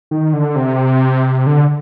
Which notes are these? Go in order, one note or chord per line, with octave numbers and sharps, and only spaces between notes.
D#3
D3
C3
D3